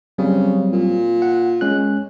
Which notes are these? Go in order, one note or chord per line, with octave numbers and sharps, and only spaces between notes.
C#3 F#3 G3 C4
A#2
F#5
G#3 C#4 F#6